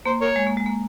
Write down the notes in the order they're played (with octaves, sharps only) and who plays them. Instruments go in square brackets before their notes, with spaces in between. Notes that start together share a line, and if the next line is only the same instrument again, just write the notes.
[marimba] A#3 [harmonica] C5
[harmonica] A#4 C#5
[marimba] G#3
A#3
G#3
A#3